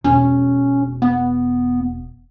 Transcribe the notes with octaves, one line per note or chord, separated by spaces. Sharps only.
E1 C#4
B3